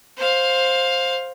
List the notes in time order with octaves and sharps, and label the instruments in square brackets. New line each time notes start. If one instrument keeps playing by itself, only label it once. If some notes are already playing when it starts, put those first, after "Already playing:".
[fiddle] C5 F5